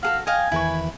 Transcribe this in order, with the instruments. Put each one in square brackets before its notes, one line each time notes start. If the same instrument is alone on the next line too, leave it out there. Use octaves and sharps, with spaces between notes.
[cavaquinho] F#4 G#4 A4 [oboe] F5
[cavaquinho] D#5 F5 G5 [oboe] G#5
[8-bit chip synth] E2 D#3 E3 [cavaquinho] E4 B4 C#6